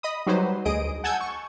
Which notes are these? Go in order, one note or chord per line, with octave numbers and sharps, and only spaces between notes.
D#5 B5 D#6
F#3 G3 D#4 G4 B4 C5
D2 G#4 D#5 D#6 D7
F#5 G#5 A5 E6 G6 G#6
C#6